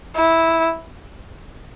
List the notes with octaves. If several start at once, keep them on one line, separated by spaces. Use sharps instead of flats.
E4